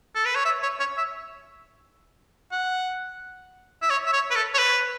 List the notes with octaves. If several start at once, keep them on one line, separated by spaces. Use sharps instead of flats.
A4
B4
C#5
E5
C#5
C#5
E5
F#5
E5
C#5
E5
C#5
B4
A4
C#5
B4